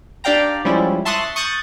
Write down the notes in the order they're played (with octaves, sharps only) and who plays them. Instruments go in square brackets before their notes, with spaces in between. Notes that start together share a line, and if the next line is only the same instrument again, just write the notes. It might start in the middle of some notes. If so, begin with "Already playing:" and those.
[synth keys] D4 G4 D5 F5 G5 A#5
F3 G3 G#3 C#4 E4
E5 A5 C6 C#6 D#6 F#6
C#6 D#6 F#6 G6 A6